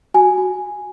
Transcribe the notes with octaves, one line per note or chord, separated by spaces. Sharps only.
F#4 G#5
F#4